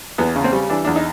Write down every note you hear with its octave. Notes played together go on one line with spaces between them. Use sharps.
E2 B3
C#3
C4
G3
E3 D4
E2 D4
D#4